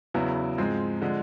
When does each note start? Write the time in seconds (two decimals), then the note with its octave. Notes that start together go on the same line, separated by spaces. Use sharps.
0.14 E2 C#3 F#3 B3 E4
0.58 G#2 F3 G#3 C4
1.02 D3 F3 G#3